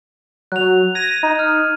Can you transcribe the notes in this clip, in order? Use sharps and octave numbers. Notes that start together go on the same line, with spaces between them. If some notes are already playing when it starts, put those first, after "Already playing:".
F#3 F#6 F7
G#6 A#6 D#7
D#4
F6